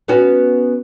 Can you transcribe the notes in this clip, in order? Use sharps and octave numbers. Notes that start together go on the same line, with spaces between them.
B3 C#4 F#4